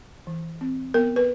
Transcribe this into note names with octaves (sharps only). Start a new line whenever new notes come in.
E3
C4
B3 A#4
B4